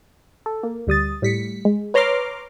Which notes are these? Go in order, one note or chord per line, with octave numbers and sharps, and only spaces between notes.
A4
A#3
D2 G3 D#6 A6
A2 G3 B6 C#7
G#3
B4 C#5 A#5 C6 D6 F6